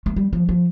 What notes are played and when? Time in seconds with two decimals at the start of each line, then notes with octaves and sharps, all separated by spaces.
0.06 A3
0.16 G3
0.33 F3
0.49 F3